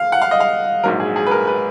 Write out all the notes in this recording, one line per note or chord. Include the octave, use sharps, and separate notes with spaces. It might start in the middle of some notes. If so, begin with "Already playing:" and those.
Already playing: F5
F#5
F5
D#5
F5
A#1 G#2 F#3 A#4
G#4
G#4
B4
A#4
B4